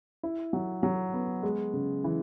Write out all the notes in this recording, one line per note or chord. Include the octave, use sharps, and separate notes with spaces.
E4
F#3
F#3
B3
G#3
C#3
E3